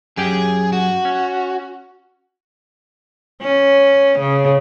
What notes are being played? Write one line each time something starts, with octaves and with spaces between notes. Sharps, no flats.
F#2 G4 G#4 G5
F#4
C#4
C#4
C#3